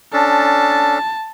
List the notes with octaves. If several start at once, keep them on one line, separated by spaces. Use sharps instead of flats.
C#4 D4 A4 A5